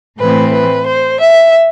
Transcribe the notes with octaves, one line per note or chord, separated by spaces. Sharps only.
A2 E3 A3 C4 B4
B4
C5
E5